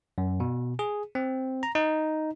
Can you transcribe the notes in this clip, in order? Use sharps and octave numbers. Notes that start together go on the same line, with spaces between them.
F#2
B2
G#4
C4
A#5
D#4